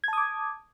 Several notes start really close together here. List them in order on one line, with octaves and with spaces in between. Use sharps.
G#6 A5 D#6 D6